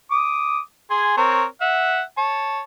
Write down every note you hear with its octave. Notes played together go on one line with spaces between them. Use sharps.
D6 D#6
G#4 G#5 C6
C4 A#4 C#5
E5 F#5
C#5 A5